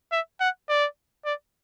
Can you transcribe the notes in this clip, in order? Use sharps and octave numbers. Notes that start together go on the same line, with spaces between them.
E5
F#5
D5
D5